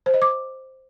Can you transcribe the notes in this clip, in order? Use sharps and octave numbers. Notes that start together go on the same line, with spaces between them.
C5
D#5
D6